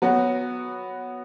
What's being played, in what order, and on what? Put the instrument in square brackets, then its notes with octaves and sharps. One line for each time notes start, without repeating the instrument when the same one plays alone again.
[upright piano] F#3 B3 F#4